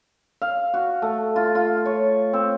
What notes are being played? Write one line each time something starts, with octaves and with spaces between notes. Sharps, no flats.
F5
F#4
A3
F4
F4
C#5
C4